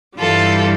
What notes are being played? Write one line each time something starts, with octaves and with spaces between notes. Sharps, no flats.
G2 E3 G3 F4 A4